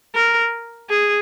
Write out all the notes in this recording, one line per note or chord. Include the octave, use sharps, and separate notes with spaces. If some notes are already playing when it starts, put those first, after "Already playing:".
A#4
G#4